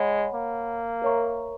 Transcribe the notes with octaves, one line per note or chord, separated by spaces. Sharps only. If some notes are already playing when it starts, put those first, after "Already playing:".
Already playing: G#3 C#5 F#5 B5
A#3
A#4 C#5 E5 A#5 C#6